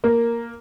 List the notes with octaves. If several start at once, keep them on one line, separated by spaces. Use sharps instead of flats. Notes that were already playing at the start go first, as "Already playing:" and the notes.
A#3